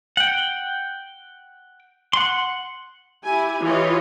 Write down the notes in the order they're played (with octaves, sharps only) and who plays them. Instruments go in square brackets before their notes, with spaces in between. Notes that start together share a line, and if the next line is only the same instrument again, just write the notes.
[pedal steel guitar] F#5 G5
F#5 C6
[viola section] E4 G4 G#5
E3 F4 G4 C#5 D#5